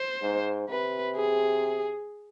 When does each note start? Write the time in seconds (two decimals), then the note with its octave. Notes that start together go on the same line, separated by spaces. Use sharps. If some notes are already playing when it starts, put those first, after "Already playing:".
Already playing: C5
0.22 G#2
0.69 C3 B4
1.16 G#4